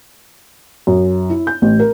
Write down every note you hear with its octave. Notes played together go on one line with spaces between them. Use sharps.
F#2
E4
G6
A1
A#4